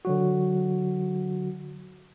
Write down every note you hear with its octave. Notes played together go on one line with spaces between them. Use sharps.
D3 F#3 F#4